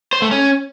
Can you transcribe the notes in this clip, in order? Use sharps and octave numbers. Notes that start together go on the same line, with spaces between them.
C5
A3
C#4